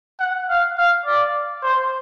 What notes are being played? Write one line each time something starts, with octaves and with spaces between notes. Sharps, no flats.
F#5
F5
F5
D5
C5